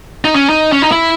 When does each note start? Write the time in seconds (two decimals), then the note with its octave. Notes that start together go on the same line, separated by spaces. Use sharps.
0.25 D#4
0.35 C#4
0.49 D#4
0.72 C#4
0.82 D#4
0.92 E4